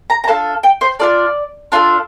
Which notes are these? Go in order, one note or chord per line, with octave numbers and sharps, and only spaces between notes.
A#5
A#5
D4 F4 A4 A5
G5
C5
D4 F4 A4 D5
D4 F4 A4